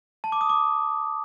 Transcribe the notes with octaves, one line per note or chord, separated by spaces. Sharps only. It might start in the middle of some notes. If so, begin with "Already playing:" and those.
A5
D6
D#6
D6